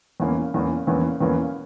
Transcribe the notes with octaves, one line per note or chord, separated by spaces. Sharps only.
E2 E3 A#3 C#4
E2 E3 A#3 C#4
E2 E3 A#3 C#4
E2 E3 A#3 C#4